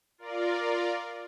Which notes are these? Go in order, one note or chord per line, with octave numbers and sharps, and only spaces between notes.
F4 A#4 D5